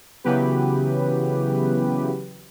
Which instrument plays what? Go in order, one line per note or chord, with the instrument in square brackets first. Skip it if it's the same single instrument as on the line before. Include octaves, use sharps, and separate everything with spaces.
[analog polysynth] C#3 E3 F#3 B3 G4 B4